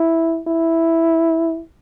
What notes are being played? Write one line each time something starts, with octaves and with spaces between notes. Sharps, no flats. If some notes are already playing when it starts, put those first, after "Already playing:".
Already playing: E4
E4